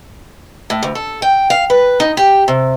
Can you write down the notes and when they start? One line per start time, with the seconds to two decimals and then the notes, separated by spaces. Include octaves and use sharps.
0.70 A2
0.83 D2
0.95 A4
1.22 G5
1.50 F5
1.70 B4
2.00 D#4
2.17 G4
2.48 C3